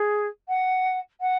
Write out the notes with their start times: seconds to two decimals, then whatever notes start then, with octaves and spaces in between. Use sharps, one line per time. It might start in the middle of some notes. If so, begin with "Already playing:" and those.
Already playing: G#4
0.48 F#5
1.20 F#5